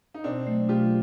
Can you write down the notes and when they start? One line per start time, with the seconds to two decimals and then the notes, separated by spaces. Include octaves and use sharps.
0.15 D#4
0.24 B2 C4 D4
0.47 F#3 A3
0.69 B2 F4 G4